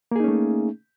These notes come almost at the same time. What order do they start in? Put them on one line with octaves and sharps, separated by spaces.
A#3 G#4 D#4 C#4 A3